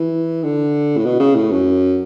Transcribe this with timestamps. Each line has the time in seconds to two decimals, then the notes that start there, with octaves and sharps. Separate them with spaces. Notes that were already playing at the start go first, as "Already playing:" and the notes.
Already playing: E3
0.43 D3
0.97 A2
1.05 B2
1.20 C#3
1.35 A2
1.51 F#2